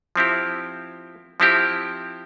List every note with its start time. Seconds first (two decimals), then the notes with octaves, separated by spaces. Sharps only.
0.16 F3 C4 E4 G4
1.40 F3 C4 E4 G4